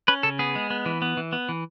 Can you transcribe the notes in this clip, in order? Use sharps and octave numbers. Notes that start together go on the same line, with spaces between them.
C#4 B4
C#3 A4
B3 G#4
G#3
B3
E3
B3
E3
B3
E3